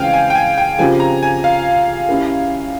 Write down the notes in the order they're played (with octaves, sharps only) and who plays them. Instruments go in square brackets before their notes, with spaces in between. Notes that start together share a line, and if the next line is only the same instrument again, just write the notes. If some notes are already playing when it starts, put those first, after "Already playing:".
Already playing: [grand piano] C#3 E3 G#3 C4 [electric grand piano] F5 G5 G#5
[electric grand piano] G#5
G5
G#5
G5
[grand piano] C#3 F3 C4 G4 A#4 [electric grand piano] G#5
[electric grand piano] A#5
G#5
F5
[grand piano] A#3 C#4 E4 G4 A#4